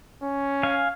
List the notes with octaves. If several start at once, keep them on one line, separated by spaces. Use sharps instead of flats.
C#4
F5 G#5